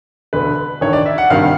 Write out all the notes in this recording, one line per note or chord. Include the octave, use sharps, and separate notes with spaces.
E1 D2 D3 B4
A1 G2 D#3 C#5
D5
E5
F#5
G#1 G2 D#3 G3 F5